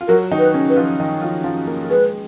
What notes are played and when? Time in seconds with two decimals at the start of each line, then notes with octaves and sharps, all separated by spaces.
0.01 F4
0.08 F#3 F#4 A#4
0.31 D#3 D#4
0.39 B4
0.54 C#3 C#4
0.69 B4
0.77 F3 F4
0.99 D#3 D#4
1.22 F3 F4
1.44 F3 F4
1.67 A#3 A#4
1.84 A#4
1.89 G#3 G#4 B4